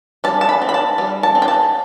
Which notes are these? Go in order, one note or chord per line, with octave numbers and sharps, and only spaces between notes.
G3 A5
A5
B5
C4
B5
A5
G3
A5
C4
G5
A5